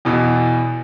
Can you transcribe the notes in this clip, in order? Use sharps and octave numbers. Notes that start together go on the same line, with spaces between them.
E2 B2 E3